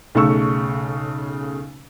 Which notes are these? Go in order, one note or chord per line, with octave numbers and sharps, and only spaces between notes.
B1 C#3 A3 C#6 E6